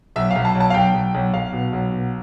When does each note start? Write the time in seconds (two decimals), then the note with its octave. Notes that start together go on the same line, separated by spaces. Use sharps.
0.16 B1 E5
0.31 B1 F5
0.45 A5
0.55 B1
0.60 A5
0.70 F5
0.74 B1 G5
0.94 B1
1.14 B1
1.33 B1 F5
1.53 B2
1.73 B1
1.92 B2